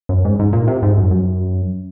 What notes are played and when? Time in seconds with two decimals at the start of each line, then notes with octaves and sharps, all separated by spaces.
0.09 F#2
0.25 G#2
0.39 G#2
0.53 A#2
0.67 C3
0.83 G#2
0.97 F#2
1.11 F#2